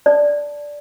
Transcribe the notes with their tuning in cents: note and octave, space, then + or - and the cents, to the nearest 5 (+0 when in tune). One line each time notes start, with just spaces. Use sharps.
D5 -5 A5 +0